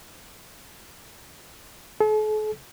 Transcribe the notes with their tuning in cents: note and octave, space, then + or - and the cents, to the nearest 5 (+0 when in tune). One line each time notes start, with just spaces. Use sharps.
A4 -45